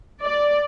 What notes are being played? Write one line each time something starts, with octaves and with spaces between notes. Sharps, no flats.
D5